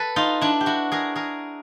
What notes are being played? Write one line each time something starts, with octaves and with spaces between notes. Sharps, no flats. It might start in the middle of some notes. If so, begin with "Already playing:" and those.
Already playing: A4 B4
D#4 F4
D4 E4
G4
E4 F#4
G#4 A#4
G#4 A#4